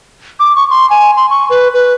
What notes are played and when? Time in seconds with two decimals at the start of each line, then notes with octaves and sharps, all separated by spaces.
0.40 D6
0.56 C#6
0.70 C6
0.90 G#5
1.17 C6
1.30 C#6
1.50 B4
1.74 B4